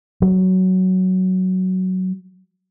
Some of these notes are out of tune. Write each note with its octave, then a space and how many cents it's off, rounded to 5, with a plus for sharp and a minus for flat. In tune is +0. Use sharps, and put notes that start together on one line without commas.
F#3 +10